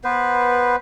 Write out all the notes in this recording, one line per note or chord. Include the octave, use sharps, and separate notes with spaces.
B3 B4 C5